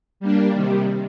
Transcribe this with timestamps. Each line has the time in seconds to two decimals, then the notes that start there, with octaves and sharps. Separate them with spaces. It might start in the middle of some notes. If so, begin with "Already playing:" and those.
0.20 G3 A#3 D4
0.53 C3 D#3 G3